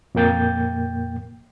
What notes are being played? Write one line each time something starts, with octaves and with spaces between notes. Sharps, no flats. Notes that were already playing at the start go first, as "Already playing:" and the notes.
F2 A#2 A#3 G5 G6 A6